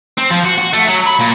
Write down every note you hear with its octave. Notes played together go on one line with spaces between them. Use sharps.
C4
F3
F#4
F#4
A3
F#3
B5
A#2